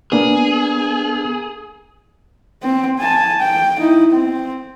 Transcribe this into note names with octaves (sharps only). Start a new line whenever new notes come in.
A#3 B3 D4 G#4
C4
G#5 A5
G5
D#4 E4
C4